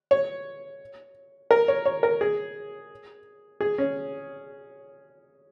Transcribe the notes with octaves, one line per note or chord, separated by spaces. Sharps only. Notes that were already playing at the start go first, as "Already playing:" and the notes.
C#5
A#4
C#5
C#5
A#4
G#4
G#4
C#4